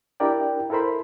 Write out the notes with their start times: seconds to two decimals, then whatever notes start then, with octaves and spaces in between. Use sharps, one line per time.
0.20 D4 E4 G4 A#4 D5 G5
0.70 E4 A4 A#4 C5 B5